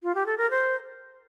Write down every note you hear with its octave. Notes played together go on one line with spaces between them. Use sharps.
F4
G4
A4
A#4
C5